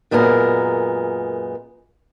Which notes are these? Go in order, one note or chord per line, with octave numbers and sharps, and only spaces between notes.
F#2 A#2 G#3 B3 G#4 A#4